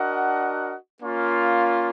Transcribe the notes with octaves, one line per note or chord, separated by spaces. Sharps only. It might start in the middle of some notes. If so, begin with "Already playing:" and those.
Already playing: D4 F#4 A#4 D#5 F#5
A#3 C#4 F4